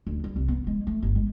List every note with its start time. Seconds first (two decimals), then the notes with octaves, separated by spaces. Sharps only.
0.07 D2
0.24 G3
0.36 C2
0.48 B3
0.67 G#3
0.87 A3
1.03 G1
1.15 G#3